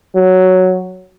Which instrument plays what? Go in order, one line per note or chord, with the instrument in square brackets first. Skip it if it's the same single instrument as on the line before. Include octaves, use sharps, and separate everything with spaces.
[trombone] F#3